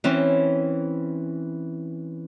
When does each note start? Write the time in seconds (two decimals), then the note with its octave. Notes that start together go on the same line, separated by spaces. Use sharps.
0.04 E3 C4 C#4